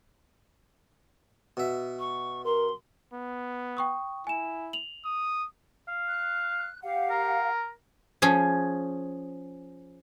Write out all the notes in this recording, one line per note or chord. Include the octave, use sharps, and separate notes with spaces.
B2 E5
C#6
A#4 C6
B3
G5 C#6 D#6
E4 G#5 E7
F7 F#7
D#6
F5
F#6
G4 F5 F#5
A#4
F3 C#4 G#4